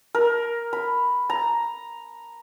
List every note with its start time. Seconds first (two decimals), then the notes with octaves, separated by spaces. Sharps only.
0.15 A#4
0.73 B5
1.30 A#5